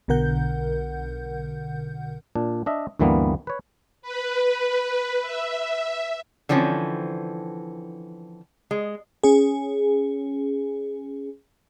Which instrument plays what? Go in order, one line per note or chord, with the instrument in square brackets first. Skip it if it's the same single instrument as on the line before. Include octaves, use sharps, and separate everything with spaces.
[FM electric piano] B1 B2 D3 A#4 F#5 G6
[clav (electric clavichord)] A#2 D4
D4 D#5 E5
D2 G2 E3 G3 A#3 B3
B4 C#5
[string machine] B4
E5
[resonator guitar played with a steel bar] D3 E3 F3 C4 C#4
G#3
[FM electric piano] C#4 G#4